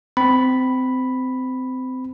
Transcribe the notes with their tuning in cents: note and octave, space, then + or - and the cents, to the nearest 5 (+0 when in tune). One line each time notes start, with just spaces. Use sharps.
C4 -25 B5 +0